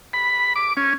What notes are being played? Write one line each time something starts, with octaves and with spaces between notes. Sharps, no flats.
B5
D6
C#4